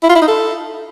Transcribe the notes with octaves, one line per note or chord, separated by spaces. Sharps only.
E4
F4
E4
D#4
A4